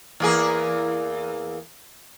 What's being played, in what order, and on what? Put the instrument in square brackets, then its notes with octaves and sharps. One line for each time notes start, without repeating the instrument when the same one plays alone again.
[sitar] E2 A#3 G#4